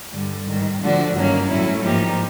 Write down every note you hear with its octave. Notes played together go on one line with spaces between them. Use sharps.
G2 D3 G3
G#2 D#3 G3
D3 F3 A3 D4 F#4
G2 D#3 F#3 A#3 C#4
A2 F#3 A3 C#4 E4
G#2 F3 A#3 D#4 G4